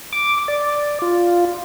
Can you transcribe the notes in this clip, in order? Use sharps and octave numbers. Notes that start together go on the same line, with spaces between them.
D6
D5
F4